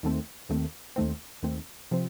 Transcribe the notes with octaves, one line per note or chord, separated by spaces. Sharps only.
D#2 D#3 A3 C4
D#2 D#3 A3 C4
D#2 D#3 A3 C4
D#2 D#3 A3 C4
C3 F3 C4